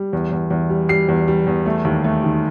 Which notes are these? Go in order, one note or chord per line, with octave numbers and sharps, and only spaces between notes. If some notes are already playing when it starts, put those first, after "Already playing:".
Already playing: G3
E2
E2
E2
G3
G3 C7
E2
G3
E2
A3
D#2
A3
D#3